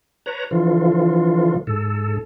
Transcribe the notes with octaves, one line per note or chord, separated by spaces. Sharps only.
B4 C#5 A#5
D3 E3 F3 F4
G#2 A4